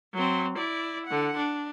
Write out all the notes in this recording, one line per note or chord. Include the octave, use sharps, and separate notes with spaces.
F#3 C4
E4 D5
D3 F#5
D4